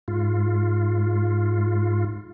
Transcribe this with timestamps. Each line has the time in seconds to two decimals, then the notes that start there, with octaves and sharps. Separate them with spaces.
0.08 G#2 F4